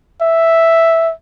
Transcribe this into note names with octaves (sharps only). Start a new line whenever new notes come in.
E5